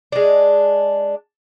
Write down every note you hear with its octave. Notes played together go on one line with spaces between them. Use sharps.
G#3 D4